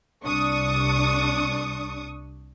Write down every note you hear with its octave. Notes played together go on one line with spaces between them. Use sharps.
C2 D4 C#6 D#6